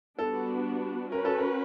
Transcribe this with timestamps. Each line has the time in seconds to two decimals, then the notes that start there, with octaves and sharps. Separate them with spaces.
0.19 G3 B3 D4 F#4 A4
1.12 C#4 F#4 A#4 B4
1.25 A4
1.38 A#4